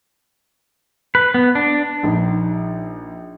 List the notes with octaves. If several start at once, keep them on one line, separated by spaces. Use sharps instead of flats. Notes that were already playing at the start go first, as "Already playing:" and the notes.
B4
B3
D4
A#1 D#4